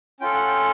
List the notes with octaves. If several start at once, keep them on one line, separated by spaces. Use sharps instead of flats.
C#4 F4 A4 G5
F#5
G5